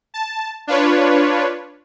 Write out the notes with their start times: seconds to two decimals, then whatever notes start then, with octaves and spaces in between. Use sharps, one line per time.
0.14 A5
0.67 D4 F4 B4 C#5